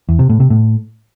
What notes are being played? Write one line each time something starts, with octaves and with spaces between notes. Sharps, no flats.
E2
C3
A2
C3
A2